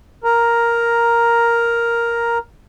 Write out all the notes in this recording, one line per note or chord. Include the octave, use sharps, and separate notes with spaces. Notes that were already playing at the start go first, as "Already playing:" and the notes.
A#4 A#5